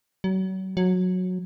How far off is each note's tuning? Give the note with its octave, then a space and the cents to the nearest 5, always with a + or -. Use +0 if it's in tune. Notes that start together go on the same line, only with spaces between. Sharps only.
F#3 +35
F#3 -15